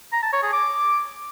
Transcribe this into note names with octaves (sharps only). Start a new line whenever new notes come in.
A#5
A5
C#5
G#4
D6